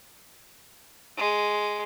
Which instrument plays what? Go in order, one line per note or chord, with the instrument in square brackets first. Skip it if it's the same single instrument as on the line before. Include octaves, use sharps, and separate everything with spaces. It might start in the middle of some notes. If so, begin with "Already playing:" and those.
[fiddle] G#3